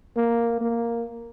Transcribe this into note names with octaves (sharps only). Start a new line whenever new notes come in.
A#3
A#3